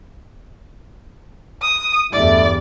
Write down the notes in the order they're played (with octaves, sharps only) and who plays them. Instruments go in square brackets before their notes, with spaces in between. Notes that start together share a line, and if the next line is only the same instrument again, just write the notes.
[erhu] D#6
[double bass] E2 G2 [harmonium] A3 E4 [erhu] D5